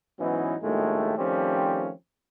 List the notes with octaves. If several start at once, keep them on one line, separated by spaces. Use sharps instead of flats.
G#2 E3 F#3 B3 C#4 D#4
A#1 D#2 A2 G#3 A3
D#3 F3 G3 A3 C4 C#4